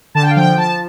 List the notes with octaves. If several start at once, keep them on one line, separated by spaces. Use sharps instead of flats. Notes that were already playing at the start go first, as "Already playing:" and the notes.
D3 A5
G5
F5
F3 G5
F3 A5